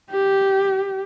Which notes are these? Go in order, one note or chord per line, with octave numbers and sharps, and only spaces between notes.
G4